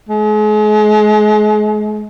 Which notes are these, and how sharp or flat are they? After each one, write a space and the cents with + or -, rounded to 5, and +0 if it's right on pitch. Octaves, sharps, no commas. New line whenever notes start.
G#3 +35